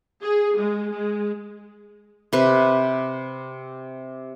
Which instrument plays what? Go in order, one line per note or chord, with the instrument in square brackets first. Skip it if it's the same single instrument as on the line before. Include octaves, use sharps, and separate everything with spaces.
[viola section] G#4
G#3
G#3
[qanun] C3 B4